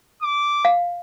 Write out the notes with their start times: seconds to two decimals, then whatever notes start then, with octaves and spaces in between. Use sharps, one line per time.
0.22 D6
0.65 F5